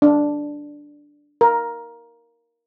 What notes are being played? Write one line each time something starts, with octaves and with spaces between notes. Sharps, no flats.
D4
A#4